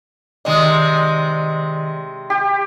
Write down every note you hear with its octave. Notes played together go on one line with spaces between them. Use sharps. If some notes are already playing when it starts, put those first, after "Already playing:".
C3 D#3 G#3 D5 D#5 D#6
G4 G5